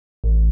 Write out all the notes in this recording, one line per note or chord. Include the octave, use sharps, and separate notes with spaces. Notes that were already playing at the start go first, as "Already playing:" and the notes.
A1